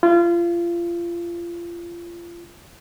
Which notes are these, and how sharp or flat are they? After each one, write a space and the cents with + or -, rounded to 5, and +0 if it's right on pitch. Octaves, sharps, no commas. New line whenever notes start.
F4 -30